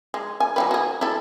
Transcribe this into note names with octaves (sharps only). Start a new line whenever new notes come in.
G#3
G#5
F#3 G3 B4
F#4 G#4
E4 A4